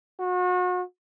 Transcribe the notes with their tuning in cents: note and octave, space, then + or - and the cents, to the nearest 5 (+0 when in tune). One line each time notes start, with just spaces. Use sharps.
F#4 -35